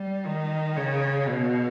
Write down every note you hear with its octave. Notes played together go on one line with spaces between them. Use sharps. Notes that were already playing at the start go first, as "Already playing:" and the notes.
Already playing: G3
D#3
C#3
B2